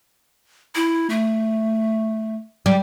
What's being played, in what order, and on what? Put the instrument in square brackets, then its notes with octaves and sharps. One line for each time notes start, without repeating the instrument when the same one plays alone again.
[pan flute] E4
A3
[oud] G3